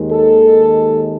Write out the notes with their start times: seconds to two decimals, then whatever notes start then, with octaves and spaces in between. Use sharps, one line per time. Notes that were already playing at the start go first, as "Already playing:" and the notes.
Already playing: D#2 D#3 G#3
0.11 A4